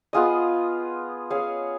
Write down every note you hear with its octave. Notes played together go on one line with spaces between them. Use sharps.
B3 F4 G#4 D#5
C#4 G#4 C#5 F5